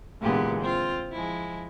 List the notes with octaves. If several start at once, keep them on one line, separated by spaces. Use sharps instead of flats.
A#2 D3 E3 G#3 B3 G4
C4 F4
F3 G#3 E4